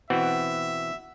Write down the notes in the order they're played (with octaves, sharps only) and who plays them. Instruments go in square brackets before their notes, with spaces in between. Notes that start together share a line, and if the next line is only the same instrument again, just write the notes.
[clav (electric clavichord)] B2 E3 C4 [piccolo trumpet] E5 [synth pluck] F#5